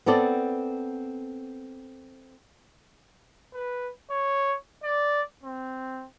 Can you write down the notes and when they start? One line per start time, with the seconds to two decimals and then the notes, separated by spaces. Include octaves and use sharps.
0.06 B3 C4 A4 D5
3.54 B4
4.10 C#5
4.83 D5
5.43 C4